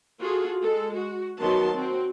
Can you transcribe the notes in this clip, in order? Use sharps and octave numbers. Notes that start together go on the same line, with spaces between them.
F4 F#4 G#4 A4
G#3 A4
F#4
D#3 F#3 B3 F#4 A5 C6
C4 F#4